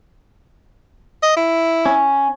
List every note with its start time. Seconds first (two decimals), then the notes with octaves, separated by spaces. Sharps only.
1.23 D#5
1.36 E4
1.86 C#4